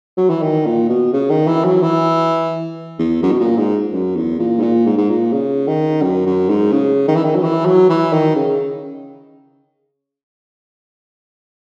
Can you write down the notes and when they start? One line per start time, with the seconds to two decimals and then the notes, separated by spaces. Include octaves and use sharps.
0.17 F#3
0.30 E3
0.42 D#3
0.65 A#2
0.89 B2
1.13 C#3
1.30 D#3
1.47 E3
1.65 F#3
1.82 E3
2.99 E2
3.23 F#2
3.31 B2
3.40 A#2
3.58 G#2
3.93 F#2
4.16 E2
4.39 A#2
4.58 G#2
4.62 A#2
4.86 G#2
4.98 G#2
5.09 A#2
5.33 C#3
5.68 D#3
6.02 F#2
6.26 F#2
6.49 G#2
6.72 C#3
7.08 D#3
7.16 E3
7.24 D#3
7.35 F#3
7.43 E3
7.66 F#3
7.89 E3
8.12 D#3
8.36 C#3